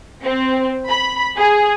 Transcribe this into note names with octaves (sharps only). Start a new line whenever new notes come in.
C4
B5
G#4